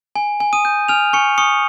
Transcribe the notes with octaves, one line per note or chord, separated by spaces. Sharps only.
G#5
G#5
D#6 D#7
G6
G#5 F6 F7
G#5 C#6 C#7
C#6 D#6 C#7